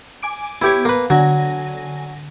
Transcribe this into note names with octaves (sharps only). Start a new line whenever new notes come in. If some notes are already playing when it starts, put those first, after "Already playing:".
G#5 D6 D7
B3 E4 G4 C#5
A#3 B4
D3 F#3 G#5 A#6